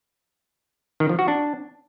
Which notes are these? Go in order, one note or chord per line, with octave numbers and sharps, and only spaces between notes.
D#3
F3
F#4
D4